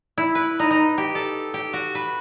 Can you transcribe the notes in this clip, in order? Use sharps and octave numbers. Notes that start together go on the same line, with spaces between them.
E4
B4
D#4
D#4
G4
A4
G4
F#4
B4